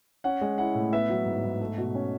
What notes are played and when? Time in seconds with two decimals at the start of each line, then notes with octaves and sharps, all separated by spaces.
0.24 C#4 F#5
0.41 G#3
0.58 E4 F#5
0.75 A2
0.92 B3 E5
1.09 F#3
1.26 G#2
1.44 G#2
1.60 A3
1.78 B2
1.95 C#4